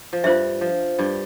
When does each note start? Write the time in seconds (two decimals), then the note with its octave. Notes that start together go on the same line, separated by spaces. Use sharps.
0.13 F3
0.24 G2 G3 F4 C5 E5
0.61 F3
0.99 G2 G3